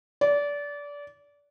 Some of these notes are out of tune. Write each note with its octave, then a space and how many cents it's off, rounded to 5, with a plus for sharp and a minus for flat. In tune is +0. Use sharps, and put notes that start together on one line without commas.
D5 -25